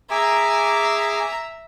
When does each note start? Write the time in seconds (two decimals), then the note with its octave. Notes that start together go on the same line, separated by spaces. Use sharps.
0.11 G#4 E5 G#5 A#5 D6